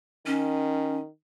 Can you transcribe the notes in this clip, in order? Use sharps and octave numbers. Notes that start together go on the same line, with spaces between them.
D#3 C#4